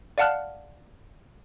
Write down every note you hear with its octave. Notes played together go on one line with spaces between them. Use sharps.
D5 F5 F#5 A5 F6 F#6